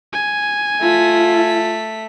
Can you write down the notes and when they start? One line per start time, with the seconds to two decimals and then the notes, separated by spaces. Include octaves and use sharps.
0.13 G#5
0.81 A3 F4 B6